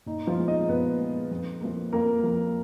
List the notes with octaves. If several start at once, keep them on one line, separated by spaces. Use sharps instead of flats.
A#2 D#4
F3 F4
G#3 B3
D#4 D#5
A#2 B3 B4
G#3 B3
F2
F3 A#3
F2 A#3 A#4
F3 A#3